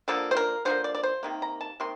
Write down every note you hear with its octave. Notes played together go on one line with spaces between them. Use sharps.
D3 F3 A#3 A4
C5
A#4
D3 F3 A#3 C5
D5
D5
C5
C3 D#3 A#3
A#5
A5
C3 D#3 A#3 C6